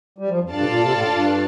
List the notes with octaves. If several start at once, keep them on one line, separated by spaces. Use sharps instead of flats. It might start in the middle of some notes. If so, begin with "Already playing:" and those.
G3
F3
F2
G2 F4 A4 D5 F5 A5
C3
A#2
C3
A2
G2
G2